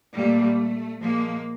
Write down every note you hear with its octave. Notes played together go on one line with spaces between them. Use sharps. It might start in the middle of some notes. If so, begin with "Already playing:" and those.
A#2 G3 A3
A#2 F3 G#3 A#3